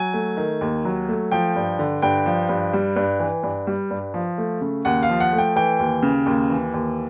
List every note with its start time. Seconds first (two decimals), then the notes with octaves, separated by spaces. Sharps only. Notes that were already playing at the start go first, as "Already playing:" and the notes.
Already playing: F#3 G#5
0.14 A3
0.37 D#3
0.61 D#2
0.85 F#3
1.09 A3
1.32 F3 G5
1.56 G2
1.79 D3
2.02 G2 G5
2.26 F3
2.49 G2
2.73 G3
2.96 G2
3.20 E3
3.43 G2
3.67 G3
3.90 G2
4.14 F3
4.38 A3
4.61 C#3
4.85 D#2 F#5
5.03 F5
5.09 F3
5.20 F#5
5.33 A3
5.38 G5
5.56 E3 G5
5.79 D#2
6.03 C#3
6.26 D#2
6.50 E3
6.74 D#2